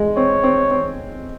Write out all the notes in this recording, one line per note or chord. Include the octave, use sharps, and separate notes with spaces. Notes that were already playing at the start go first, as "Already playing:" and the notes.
Already playing: G#3
C4 C#5
C4
C4